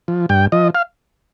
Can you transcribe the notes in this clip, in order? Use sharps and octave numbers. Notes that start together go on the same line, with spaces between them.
F3
G2 G5
F3 D#5
F5